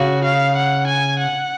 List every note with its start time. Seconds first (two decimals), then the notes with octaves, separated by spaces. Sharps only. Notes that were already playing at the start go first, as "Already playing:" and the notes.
Already playing: C#3 F#4
0.24 F5
0.57 F#5
0.87 G#5
1.19 F#5